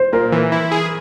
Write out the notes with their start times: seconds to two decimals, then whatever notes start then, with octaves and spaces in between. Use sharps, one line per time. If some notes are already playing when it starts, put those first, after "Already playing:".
Already playing: C5
0.13 A#2 A#4
0.32 E3
0.52 E4
0.72 G#4